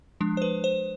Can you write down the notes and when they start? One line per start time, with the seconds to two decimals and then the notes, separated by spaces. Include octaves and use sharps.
0.21 F3 G#3 D4
0.37 C5
0.42 B4
0.64 C5